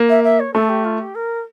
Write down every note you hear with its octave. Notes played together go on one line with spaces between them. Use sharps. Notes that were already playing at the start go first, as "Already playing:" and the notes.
Already playing: A#3
E5
E5
C#5
A3 A4
G4
F4
G4
A#4